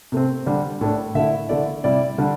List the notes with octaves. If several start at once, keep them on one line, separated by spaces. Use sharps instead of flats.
C3 A3 C4
D3 G3 D4
A2 A3 D4
D3 A3 E4 E5
D3 A3 E4 D5
C3 G3 E4 D5
D3 G3 D4